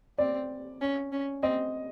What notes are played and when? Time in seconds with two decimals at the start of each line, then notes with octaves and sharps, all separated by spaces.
0.18 C4 D5
0.81 C#4
1.12 C#4
1.43 C4 D#5